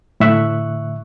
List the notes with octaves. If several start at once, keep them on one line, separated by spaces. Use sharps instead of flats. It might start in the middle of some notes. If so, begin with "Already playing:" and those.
A2 D3 E5 C#6 F#6